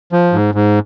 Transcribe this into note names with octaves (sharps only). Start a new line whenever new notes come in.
F3
G#2
G#2